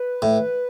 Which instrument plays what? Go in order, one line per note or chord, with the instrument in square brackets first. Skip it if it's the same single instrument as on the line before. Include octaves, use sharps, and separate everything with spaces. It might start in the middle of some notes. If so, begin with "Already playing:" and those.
Already playing: [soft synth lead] B4
[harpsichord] A2